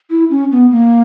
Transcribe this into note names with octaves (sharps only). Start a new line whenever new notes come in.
E4
C#4
B3
A#3